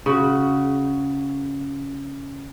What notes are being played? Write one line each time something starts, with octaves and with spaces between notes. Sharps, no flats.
C#3 F#4